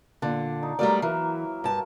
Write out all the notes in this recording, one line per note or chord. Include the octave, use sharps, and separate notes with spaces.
A#2 D3 D4
D#4
F#3 G3 A3 A#3 D5 F5
E3 A#4 E5
G2 A5